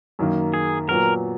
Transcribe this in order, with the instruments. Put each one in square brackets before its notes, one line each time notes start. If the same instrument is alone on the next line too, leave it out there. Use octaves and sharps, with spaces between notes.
[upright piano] F#2 D#3 A#3
[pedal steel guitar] G#4
[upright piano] A#2 F#3 B3 [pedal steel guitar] A#4